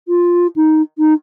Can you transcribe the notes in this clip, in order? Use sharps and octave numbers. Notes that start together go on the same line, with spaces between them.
F4
D#4
D#4